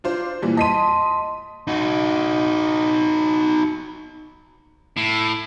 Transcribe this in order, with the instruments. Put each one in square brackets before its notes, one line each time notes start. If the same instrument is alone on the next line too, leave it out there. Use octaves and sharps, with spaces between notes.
[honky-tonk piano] D4 F4 C5
A#2 E3 G3
[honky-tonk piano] D#5 B6 D#7 [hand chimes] A5 C6
[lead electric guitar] D#4 F#4
[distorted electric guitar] A2